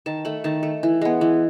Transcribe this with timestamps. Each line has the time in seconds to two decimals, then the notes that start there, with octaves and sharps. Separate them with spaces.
0.06 D#3 A5
0.25 A3 B5
0.44 D#3 A5
0.63 A3
0.83 E3
1.01 G#3 B3
1.21 E3